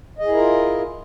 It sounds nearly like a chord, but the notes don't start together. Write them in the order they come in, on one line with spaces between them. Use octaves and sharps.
D#5 G#4 E4 A#4 F4